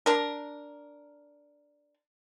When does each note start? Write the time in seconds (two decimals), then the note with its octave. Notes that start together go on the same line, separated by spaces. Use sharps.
0.06 D4 A#4